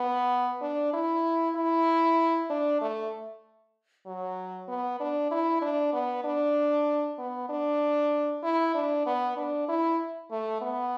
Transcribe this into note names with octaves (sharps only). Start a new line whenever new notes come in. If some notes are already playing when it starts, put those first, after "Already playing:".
Already playing: B3
D4
E4
E4
D4
A3
F#3
B3
D4
E4
D4
B3
D4
B3
D4
E4
D4
B3
D4
E4
A3
B3